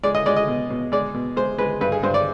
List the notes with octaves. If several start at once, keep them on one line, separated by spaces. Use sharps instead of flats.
G#3 D5
D#5
G#3 D5
D#5
B2
B2
G#3 D5
B2
G#3 C5
G#3 B4
G2 B4
G#4
G2 C5
D5